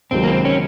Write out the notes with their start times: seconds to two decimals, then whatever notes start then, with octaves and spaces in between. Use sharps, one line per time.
0.11 C#2 C3 D#3 F#3 C4
0.24 A#3
0.28 C4
0.45 C#4